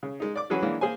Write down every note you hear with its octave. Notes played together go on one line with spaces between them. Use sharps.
C#3
G#3 D#4
D5 D6
E3 F#3 C#4 F#4 G#4 B4
E3 F#3 G#3 A#3 D4
A#3 G#4 C5 G#5